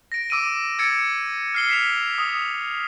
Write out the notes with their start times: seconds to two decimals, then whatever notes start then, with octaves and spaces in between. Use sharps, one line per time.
0.12 A#6 D7
0.30 D6 E6 D7 D#7
0.79 E6 G#6 A6 C#7 D7
1.54 F6 C7 G7
1.70 B6 E7 F7
2.18 D#6